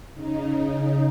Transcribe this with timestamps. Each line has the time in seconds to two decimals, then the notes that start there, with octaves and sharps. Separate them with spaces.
0.14 C#3 D#4